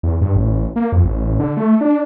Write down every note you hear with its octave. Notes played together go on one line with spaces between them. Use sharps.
E2
G2
A1
A#3
F2
A1
D3
A3
D4